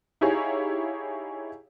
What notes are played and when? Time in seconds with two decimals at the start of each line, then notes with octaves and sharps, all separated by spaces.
0.21 D#4 E4 G4 G#4 C#5 F5